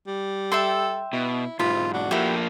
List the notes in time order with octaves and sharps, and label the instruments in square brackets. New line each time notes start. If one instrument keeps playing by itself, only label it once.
[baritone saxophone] G3
[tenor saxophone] A4 [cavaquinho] E5 G5 C6
[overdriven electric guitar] B2 [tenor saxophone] E4
[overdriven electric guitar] B1 G#2 [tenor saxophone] C3 [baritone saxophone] F4 [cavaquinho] B5
[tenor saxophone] D4 [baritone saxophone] F#4
[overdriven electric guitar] F3 A#3 [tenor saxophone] A3 [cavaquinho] E4 G4